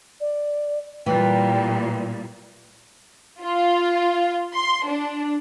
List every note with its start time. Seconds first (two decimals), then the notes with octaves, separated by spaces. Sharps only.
0.21 D5
1.06 A#2 E3 G3 G5
3.43 F4
4.54 C6
4.87 D4